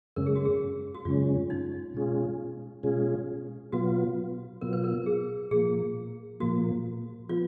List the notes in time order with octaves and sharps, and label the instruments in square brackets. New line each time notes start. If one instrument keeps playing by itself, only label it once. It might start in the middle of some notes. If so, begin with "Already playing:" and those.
[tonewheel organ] F#2 C#3 G#3 C#4 [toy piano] A#4
[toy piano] G#4
F#4
G#4
F#4
[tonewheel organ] F#2 C#3 G#3 C#4 [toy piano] F4
[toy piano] D#4
[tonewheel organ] B2 G#3 C#4 F4 G#4
B2 G#3 C#4 F4 G#4
[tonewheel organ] B2 F#3 B3 F4 [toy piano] F#4
[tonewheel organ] B2 F#3 B3 F4 [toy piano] A#4
[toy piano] B4
A#4
G#4
[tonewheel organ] A#2 F3 A#3 [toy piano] G#4
[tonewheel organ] A#2 F3 A#3 [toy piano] F#4
[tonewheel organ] F3 B3 [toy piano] F4